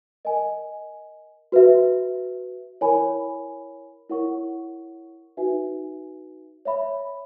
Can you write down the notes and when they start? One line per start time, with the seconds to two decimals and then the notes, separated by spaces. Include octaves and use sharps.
0.25 A#4 D#5 G#5
1.52 F#4 B4 E5
2.81 E4 A#4 C#5 G#5 B5
4.10 E4 A#4 C#5 F#5 C#6
5.37 D#4 F#4 B4 E5 G#5
6.65 C#5 E5 B5